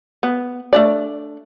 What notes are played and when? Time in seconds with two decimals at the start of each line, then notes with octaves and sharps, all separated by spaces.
0.23 B3
0.73 A3 D4 D5